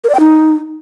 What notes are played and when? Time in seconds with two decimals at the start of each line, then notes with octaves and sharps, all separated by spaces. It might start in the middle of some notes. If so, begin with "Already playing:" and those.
0.04 A#4
0.09 D5
0.15 G5
0.20 D#4